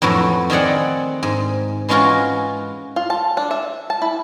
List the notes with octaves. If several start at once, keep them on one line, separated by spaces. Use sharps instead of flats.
F2 A2 E3 F#3
D#3 C4 G#4 D5 F#5
G#2
E3 G#3 C#4 F4 F#4 A#4
F4
A5
D4
E5
A5
E4